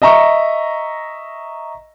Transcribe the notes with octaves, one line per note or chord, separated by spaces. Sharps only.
D#5 E5 A#5 C#6